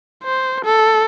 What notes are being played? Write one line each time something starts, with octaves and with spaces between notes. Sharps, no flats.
C5
A4